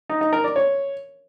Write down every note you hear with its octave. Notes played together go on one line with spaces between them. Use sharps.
D#4
D#4
A#4
D5
C#5